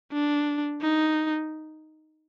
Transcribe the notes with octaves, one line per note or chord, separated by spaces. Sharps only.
D4
D#4